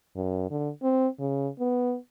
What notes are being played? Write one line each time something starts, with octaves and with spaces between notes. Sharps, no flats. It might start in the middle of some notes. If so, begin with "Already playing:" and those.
F#2
D3
C4
C#3
B3